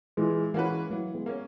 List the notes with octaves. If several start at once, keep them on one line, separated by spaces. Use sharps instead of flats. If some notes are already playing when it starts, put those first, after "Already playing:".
A#2 E3 G#3
E3 G#3 A#3 C#4 F#4 B4
E3 F#3 A#3
G#3 B3
A#3 C#4